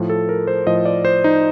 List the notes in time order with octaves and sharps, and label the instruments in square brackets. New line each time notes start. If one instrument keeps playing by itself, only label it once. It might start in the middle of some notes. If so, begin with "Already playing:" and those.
Already playing: [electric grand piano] A2 F3
A4
A#4
C5
A2 F3 D#5
D5
C5
D#4